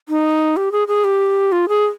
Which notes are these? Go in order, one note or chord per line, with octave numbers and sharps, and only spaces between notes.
D#4
G4
G#4
G#4
G4
F4
G#4